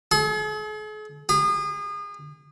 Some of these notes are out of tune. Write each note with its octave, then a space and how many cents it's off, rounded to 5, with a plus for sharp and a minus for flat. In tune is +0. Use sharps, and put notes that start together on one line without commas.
G#4 +45
G#4 -35